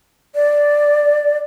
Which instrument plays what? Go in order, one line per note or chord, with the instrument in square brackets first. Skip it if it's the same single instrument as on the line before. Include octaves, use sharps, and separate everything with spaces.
[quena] D5